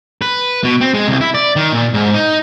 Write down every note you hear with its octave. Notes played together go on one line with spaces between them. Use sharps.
B4
B2
C4
G#3
C2
E4
D5
D#3
A#2
G#2
D#4